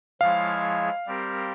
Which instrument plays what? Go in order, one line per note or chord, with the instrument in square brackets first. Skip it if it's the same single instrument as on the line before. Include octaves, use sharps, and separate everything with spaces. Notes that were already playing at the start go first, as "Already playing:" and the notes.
[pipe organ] F3 G#3 E4 G#4 C#5 [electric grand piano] F5
[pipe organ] G3 C4 G4 A#4